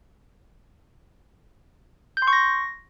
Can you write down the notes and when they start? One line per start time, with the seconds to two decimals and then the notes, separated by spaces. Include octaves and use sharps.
2.17 G6
2.22 C6
2.27 C#6
2.33 A#6